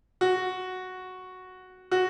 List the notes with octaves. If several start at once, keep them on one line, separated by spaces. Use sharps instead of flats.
F#4
F#4